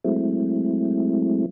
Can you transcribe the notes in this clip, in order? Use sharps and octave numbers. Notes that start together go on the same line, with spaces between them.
F#3 G#3 A3 C4 E4